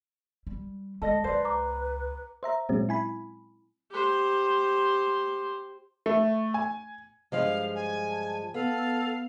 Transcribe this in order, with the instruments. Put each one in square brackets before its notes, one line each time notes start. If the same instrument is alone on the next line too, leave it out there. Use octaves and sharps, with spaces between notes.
[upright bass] G3
[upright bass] G#3 [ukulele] A4 D#5 [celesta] A5 A#6
[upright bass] C#2 [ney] B4 [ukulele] C5 D5
[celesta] A#5 D6
[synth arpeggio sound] C5 E5 A#5
A#2 F#3 G#3 C4 C#4
E4 G#5 B5
[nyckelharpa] G4 C5
[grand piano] A3
G#5
[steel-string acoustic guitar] G2 F3 G#3 [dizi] F5
[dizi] G#5
[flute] A5
[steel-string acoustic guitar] B3 [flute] A4 [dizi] F5